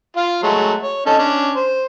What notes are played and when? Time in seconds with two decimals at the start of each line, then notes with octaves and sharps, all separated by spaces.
0.17 F4 F5
0.43 F#3 G#3 A3
0.83 C#5
1.06 C#4 D#4 A4
1.19 C#4 D4
1.55 C5